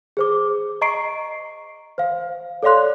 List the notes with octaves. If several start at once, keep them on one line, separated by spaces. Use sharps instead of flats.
G#4 C5 D6
D#5 A#5 C#6 C7 D7
C5 F5
A4 C#5 D5 F5 C6 F#6